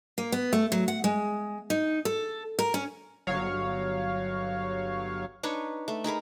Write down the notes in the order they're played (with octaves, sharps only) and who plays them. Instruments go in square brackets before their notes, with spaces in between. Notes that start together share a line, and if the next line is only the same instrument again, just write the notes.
[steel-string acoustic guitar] A#3
B3
A3
F#3
F#5
G#3
D#4
A4
A#4
C#4
[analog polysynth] G1 F#3 C#5 F5
[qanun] D4 D#4 B4 C#5
A3
D#4 G#4 A#4 B5